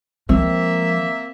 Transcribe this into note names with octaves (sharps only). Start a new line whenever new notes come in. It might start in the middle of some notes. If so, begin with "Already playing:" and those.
F3 G#3 A#3 C4 E5